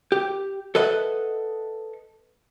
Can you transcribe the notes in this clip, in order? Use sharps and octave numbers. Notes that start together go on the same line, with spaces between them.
G4
A4 B4 D#5 E5 F#5